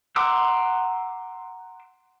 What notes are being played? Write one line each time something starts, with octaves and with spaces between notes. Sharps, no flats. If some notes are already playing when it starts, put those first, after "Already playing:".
F#5 A#5 C6 D6 E6